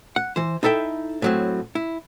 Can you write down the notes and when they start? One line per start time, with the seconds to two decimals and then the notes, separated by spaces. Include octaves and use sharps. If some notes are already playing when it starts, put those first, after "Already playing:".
0.16 F#5
0.36 E3 C5
0.63 D#4 E4 A4 E5 G5
1.22 A2 F#3 C4
1.75 E4